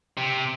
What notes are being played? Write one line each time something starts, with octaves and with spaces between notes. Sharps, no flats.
C3